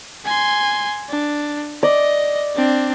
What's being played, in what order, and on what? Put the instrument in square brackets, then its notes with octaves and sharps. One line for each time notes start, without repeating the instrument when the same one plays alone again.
[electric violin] G#5 C6
D4
[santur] D5 [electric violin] D#5
[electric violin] C4 D4